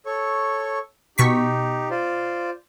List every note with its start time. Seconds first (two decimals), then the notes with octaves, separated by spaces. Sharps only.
0.06 A4 C#5 C#6
1.18 B2 D#4 G4 C#6 B6
1.91 F4 C5 D5